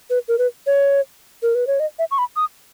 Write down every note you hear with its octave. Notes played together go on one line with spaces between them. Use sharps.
B4
A#4
B4
C#5
A#4
B4
C#5
D#5
E5
C#6
B5
D#6